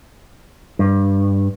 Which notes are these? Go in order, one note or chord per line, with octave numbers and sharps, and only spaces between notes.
G2